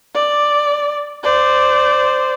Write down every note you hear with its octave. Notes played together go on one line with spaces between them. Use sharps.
D5
C5 D5